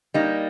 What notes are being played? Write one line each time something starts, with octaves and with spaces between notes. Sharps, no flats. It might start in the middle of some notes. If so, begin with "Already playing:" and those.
G3 A#3 D#4